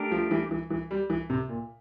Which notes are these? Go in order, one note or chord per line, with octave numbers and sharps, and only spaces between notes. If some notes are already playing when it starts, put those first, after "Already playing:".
Already playing: A3 D4 G4 A#4
F3
E3
E3
E3
G3
E3
C3
A#2